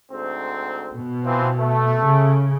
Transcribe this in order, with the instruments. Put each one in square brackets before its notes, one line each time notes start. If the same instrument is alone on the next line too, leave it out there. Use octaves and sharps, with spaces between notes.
[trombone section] D2 G#2 C4
[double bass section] B2
[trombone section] E3 F3 C4
A3
[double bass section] C#3